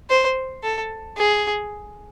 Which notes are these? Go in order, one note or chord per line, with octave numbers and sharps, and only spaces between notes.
C5
A4
G#4